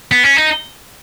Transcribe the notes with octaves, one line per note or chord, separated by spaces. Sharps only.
B3
C#4
D#4